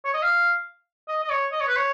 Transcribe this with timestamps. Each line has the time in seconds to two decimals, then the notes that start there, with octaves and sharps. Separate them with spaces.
0.05 C#5
0.14 D#5
0.22 F5
1.08 D#5
1.24 D#5
1.30 C#5
1.52 D#5
1.60 C#5
1.68 B4
1.77 C#5